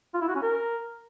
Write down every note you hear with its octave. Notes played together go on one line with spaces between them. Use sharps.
F4
E4
F#4
C#4
A#4